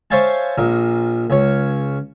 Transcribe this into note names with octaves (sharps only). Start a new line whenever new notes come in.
C5 C#5 E5 F5 G#5 A5
A#1 A#2
C#2 C#5